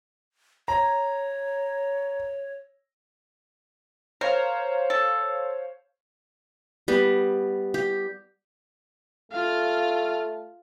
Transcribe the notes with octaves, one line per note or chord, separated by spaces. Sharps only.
C#5 A#5
A#4 C5 C#5 F5
A4
G3 B3
G4
A3 F4 F5